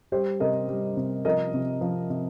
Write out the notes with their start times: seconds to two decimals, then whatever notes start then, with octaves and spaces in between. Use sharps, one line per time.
0.12 G3 G4 C5
0.40 C3 A#4 D#5
0.68 G3
0.97 C3
1.25 F3 A#4 D#5
1.54 C3
1.81 F3
2.10 C3